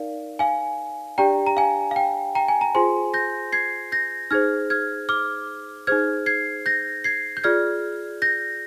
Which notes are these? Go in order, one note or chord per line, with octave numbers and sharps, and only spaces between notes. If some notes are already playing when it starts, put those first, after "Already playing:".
Already playing: D#4 A#4 D5 F5
F5 G#5
D4 G4 D5 G5 A#5
A#5
F5 G#5
F5
G5
G5 A#5
G#5
A#5
F4 G#4 C5 G#5 C6
G6 A#6
G#6 C7
G6 A#6
D#4 G#4 C5 F6 G#6
F6 G#6
D6 F6
D#4 G#4 C5 F6 G#6
G#6 C7
G6 A#6
G#6 C7
G6
F4 G#4 D5 F6 G#6
G6 A#6